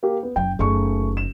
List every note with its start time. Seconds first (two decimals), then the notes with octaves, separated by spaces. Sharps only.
0.03 A#3 G4
0.23 B3
0.36 F#1 F#3 G5
0.59 F#1 A3 D#4 G#4 C#6
1.17 E7